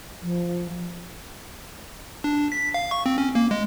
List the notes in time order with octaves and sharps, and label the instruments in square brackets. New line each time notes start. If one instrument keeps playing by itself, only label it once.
[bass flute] F3
[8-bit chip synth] D4
B6
F5
C#6
C4
C#4
A#3
G#3